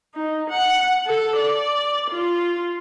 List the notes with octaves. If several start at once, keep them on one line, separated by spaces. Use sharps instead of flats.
D#4
F#5
A4
D5
F4